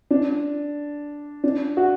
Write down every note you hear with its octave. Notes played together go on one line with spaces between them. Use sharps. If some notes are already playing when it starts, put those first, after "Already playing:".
D4
D4
F#4